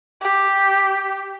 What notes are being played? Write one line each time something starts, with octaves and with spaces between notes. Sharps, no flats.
G4